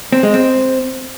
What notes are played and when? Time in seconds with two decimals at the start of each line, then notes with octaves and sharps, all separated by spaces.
0.13 C4
0.23 G#3
0.34 C4